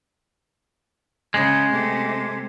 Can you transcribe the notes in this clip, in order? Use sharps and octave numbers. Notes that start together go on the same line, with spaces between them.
C#3 G#3
C3 A3